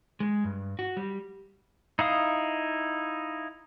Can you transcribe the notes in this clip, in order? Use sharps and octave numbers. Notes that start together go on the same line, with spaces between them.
G#3
G2
F#4
G3
D#4 E4 F5 D#6